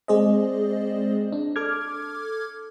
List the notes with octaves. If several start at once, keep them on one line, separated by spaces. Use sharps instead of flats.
G#3 C4 G#4 C5 D5 D#5
D4
A4 D6 F6 G#6